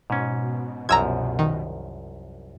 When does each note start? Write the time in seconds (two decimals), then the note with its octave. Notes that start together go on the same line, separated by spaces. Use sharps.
0.10 G#2 B2 C#4
0.89 C2 F#2 F3 A#5 E6 G#6
1.39 D#3